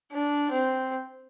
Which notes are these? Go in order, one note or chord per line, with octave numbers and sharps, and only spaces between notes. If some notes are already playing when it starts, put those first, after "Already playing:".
D4
C4